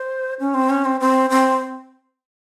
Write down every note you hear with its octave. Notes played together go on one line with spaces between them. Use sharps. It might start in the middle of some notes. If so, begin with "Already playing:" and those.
Already playing: C5
C#4
C4
C#4
C4
C4
C4